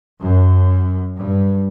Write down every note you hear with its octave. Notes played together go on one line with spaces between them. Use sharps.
F#2
G2